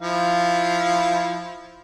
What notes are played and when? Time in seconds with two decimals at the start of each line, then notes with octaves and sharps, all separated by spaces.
0.01 F3 E4 F5